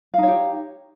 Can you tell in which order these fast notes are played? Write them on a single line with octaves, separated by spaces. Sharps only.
F5 D#4 C#5 G4